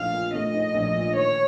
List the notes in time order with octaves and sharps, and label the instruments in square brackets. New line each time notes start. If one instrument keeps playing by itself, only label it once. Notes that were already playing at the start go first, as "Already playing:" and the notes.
Already playing: [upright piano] A#1 A3 D#4 [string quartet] F5
[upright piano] A#2
[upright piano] A3 [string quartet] D#5
[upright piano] D#4
A#1
A#2
[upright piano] D#3 [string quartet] C#5